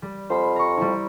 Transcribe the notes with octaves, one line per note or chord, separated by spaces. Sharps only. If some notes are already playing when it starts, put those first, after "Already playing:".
G3
F2 C5 B5
A#5 C#6
G3 E4